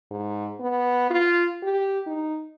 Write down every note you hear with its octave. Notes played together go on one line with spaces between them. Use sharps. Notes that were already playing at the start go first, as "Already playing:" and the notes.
G#2
B3
F4
G4
D#4